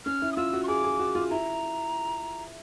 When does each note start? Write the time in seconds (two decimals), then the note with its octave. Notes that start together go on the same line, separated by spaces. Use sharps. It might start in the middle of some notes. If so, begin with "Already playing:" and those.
0.06 C#4 F6
0.22 E4
0.32 D#6
0.36 F4 E6
0.53 F#4
0.63 C#6
0.68 G#4 D6
0.84 G#4
0.99 F#4
1.15 F4
1.31 E4 A#5